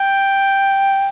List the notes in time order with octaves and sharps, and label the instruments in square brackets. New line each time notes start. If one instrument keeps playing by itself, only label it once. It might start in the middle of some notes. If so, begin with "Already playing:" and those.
Already playing: [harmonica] G5